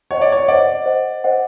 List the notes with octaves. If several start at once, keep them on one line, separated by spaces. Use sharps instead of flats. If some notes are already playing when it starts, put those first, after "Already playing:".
C5 C#5 D#5 F#5
D5
C#5
C5 D5 D#5 F#5
C5 D#5 F#5
C5 D#5 F#5